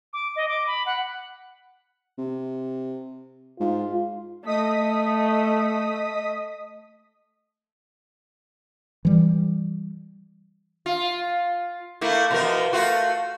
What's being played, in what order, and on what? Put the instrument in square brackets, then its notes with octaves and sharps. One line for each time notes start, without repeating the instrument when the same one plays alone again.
[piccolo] D6
D#5
D6
B5
F#5
[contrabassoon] C3
[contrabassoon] G#2 [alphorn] F4
[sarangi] A3 [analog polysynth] D#5 D#6 B6
[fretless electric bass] E3 G3
[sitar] F4
A3 A#3 E4
B2 F3 A#4
A3 F4 F#4